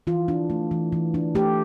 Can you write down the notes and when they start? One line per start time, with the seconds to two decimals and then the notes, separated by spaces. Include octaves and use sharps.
0.07 E3 F4
0.28 D4
0.50 A3
0.71 E3
0.92 E3
1.14 D4
1.35 A3 G4